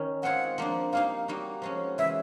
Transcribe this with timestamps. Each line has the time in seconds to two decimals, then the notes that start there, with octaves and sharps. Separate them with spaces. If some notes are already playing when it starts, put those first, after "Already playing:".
Already playing: D#3 C#4
0.23 G#3 C4 F4 G#4 F#5
0.58 F3 A#3 D4
0.92 G3 A#3 D#4 F5
1.28 G3 A#3 D#4 F#4
1.62 F3 G#3 C#4 F#4
1.98 C#3 E3 G#3 E5